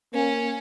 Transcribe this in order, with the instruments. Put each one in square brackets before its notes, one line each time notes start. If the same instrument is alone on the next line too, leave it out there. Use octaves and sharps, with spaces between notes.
[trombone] A#3 [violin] C#4